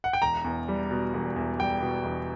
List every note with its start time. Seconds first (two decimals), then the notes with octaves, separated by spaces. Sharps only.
0.04 F#5
0.13 G5
0.22 E1 A#5
0.44 E2
0.68 G3
0.91 B2
1.14 E1
1.36 E2
1.59 G3 G5
1.82 B2
2.05 E1